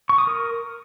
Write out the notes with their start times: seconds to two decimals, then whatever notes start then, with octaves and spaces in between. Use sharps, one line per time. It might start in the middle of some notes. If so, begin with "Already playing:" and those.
0.09 C#6
0.18 D#6
0.27 A#4